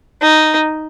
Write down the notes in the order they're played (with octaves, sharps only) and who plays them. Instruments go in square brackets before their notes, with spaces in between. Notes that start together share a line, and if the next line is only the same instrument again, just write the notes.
[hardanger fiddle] D#4